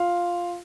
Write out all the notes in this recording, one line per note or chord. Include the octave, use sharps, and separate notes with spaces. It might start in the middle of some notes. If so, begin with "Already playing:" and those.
Already playing: F4 F5